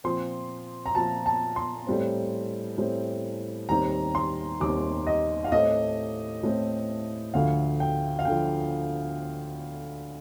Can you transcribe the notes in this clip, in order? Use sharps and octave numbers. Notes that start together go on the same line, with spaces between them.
A#2 F3 C4 C6
A#5
A#2 F3 C4 A5
A5
C6
A2 G3 C4
A2 G3 C4
D#2 D#3 G3 C4 A#5
C6
D#2 D#3 G3 C4 D6
D#5
F5
A2 A3 C4 D#5
A2 A3 C4
D2 D3 F3 F5
G5
F5
D3 F3 G5